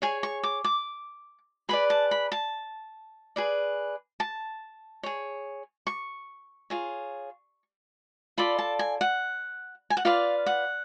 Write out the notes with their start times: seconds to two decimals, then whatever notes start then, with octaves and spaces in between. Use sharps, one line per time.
0.02 G#4 C#5 G#5
0.23 C#6
0.43 D6
0.64 D6
1.69 G#4 B4 D5 B5
1.90 A5
2.11 B5
2.32 A5
3.36 G#4 B4 D5
4.20 A5
5.03 G#4 C#5
5.87 C#6
6.70 F4 G#4 C#5
8.38 F4 A4 D5 B5
8.59 A5
8.79 G#5
9.01 F#5
9.90 G#5
9.97 F#5
10.05 F4 B4 D5 F5
10.46 F#5